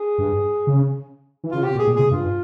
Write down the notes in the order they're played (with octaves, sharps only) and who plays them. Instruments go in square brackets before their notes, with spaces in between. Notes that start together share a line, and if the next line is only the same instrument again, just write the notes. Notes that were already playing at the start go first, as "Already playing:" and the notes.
Already playing: [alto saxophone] G#4
[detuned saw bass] G2
C#3
E3
[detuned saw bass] C#3 [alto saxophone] F4
[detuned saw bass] C3 [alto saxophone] G4
[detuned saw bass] A#2
[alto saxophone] G#4
[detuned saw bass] A#2
[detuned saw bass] C3 [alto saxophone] G#4
[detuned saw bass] G2 [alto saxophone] F4